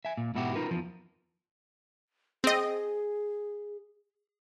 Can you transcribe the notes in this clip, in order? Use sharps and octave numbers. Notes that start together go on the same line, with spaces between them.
E5 G#5
A#2
G#2 B2 E4 F#4 G4 F#5
D#4 F4 A#4 B4
E2 F3
C4 G#4 D#5